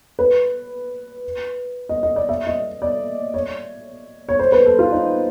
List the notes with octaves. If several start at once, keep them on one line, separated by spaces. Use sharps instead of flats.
B4
D#5
D#5
D5
E5
D#5
D5
C#5
C#5
C5
B4
A4
F4
D#4